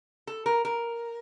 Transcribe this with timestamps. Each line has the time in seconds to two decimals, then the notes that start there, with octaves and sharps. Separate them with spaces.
0.27 A4
0.46 A#4
0.65 A#4